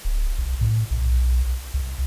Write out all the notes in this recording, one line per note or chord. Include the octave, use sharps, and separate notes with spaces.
D1
B1
A2
B1
C2